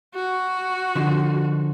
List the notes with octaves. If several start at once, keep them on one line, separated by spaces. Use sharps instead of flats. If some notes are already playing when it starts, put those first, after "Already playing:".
F#4
D3 F3 D#4